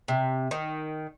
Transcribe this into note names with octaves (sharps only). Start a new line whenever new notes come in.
C3
D#3